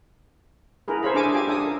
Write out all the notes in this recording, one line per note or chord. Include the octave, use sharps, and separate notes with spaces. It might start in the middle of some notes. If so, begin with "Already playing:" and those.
E4 G#4 A#4 B4
A4 A#4 C5 C#5 F5 B5
D4 G#4 A4 E5 G#5 D6
F4 G4 G#5 D6
D4 A4 E5 D#6
A#4